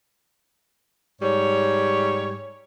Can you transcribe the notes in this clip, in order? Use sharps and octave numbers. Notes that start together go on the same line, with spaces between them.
G#2 G3 C#5